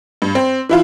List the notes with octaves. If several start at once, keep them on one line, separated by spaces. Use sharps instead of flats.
G2
C4
E3 E4 F4